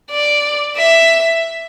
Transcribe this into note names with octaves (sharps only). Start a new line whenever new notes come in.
D5
E5